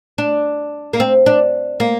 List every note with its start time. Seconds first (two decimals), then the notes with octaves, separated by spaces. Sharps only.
0.18 D4
0.93 A#3
1.00 C4
1.26 D4
1.80 A#3